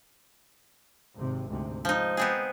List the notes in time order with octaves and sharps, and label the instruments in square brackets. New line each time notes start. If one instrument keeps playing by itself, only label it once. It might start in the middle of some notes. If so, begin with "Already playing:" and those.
[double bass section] G#1 C3
D2 G#2 C3
[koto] F3 D#4 [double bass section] G#3
[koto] B3 C4 G#4